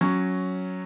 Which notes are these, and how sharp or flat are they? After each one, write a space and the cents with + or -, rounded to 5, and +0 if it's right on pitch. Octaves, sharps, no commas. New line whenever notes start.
F#3 +0 C#4 +0